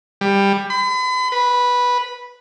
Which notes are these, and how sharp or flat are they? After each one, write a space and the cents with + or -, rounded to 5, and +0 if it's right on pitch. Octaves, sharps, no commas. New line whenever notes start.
G3 +15
B5 +40
B4 -10